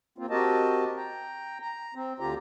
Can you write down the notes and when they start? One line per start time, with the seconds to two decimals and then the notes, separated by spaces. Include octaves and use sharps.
0.18 A#3 C4 F4
0.30 C4 F#4 G4 A#4 D#5 A5
0.96 G5 A#5
1.61 A#5
1.95 C4
2.20 D2 D3 F4 G4 A#5